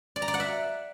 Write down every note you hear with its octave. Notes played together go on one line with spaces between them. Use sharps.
D5
A#5
D5
F#5
E5